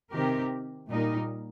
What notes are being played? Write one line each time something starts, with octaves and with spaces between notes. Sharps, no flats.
C3 D#3 C4 G4 A#4
A#2 G3 D#4 A#4